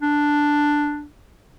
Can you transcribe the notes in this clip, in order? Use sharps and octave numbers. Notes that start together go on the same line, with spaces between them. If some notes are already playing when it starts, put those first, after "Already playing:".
D4